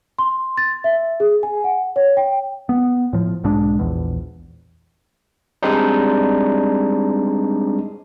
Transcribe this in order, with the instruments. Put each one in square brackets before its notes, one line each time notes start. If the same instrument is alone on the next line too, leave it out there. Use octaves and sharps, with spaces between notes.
[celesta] C6
A6
E5
G#4
G#5
F#5
C#5
G5
[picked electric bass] B3
A2 F3
B1 G#2 G#3 D4
A#1 E2
[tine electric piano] G3 G#3 C4 D4 D#4